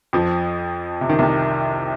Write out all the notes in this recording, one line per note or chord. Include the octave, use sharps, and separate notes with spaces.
F2 F3
C3
D#3
C2 C3